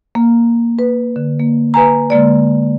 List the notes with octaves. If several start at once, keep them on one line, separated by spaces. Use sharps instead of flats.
A#3
B4
D3
A#3
B4 G#5 A#5
D3 G#3 A#3 D5